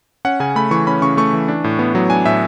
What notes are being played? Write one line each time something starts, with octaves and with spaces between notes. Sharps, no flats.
C#4 F#5
C#3 G#5
A3 B5
E3 C#6
C#4 B5
C#3 C#6
A3 C#6
E3
D4
A2
B3
F#3
D4 G#5
A2 E5